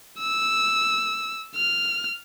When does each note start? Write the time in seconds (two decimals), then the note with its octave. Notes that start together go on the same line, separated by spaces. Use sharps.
0.19 E6
1.55 F6